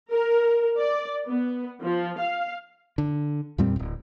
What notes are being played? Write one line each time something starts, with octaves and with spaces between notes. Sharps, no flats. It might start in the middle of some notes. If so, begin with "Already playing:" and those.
A#4
D5
B3
F3
F5
D3
F2 A#2 G3 C4
D1 F2